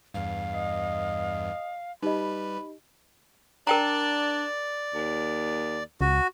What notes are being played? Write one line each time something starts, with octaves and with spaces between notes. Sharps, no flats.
E2 G2 F5
D#5 C7
G3 D#4 G4 B4 D#5 B5
D4 A#4 D5 G5 A#5
D#2
C#2 F#4